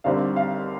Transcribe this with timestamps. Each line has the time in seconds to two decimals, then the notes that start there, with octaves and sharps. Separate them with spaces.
0.04 D#2 D3 G3 C4 F5
0.36 F5